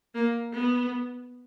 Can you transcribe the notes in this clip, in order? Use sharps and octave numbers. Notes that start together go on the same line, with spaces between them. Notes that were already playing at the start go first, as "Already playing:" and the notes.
A#3
B3